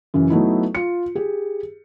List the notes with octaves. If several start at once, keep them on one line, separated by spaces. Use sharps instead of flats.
F#2 C#3 E3
F#3 A3 B3 D#4 E4
F4 C#7
G4 G#4